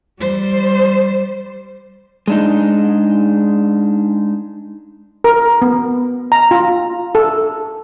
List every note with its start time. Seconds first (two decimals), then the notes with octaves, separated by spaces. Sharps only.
0.19 G3 C5
2.28 G#3 D4 D#4
5.24 A#4
5.62 B3
6.32 A#5
6.51 F4
7.15 A4